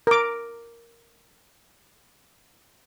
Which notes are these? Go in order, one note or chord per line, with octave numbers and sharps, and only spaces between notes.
A#4 D6